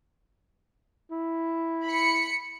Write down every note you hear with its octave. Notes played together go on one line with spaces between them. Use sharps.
E4
B5 C#7